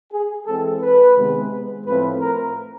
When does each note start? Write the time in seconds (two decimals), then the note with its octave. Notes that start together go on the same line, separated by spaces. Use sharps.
0.12 G#4
0.46 E3 G#3 C4 A4
0.81 B4
1.16 C3 D#3 G#3 B3
1.86 A2 F3 A3 C4 B4
2.21 A#4